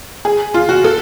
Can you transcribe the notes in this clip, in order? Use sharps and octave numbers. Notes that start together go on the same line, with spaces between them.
G#4
F4
F#4
A4